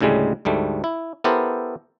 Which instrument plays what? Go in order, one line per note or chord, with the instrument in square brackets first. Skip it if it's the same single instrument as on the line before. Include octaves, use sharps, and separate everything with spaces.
[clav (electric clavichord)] D2 A2 C#3 G3 G#3
D2 G#2 G3 A3
E4
B3 E4 G4 A4 A#4 C5